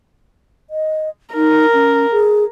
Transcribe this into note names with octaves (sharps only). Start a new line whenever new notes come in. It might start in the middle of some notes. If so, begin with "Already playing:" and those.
D#5
D#4 A#4
C#4
G#4